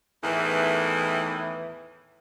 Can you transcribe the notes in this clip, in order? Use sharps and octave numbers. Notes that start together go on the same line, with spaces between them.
E2 A2 D#3 E3